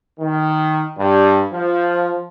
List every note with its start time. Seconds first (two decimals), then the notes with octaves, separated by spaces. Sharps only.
0.20 D#3
0.98 G2
1.53 F3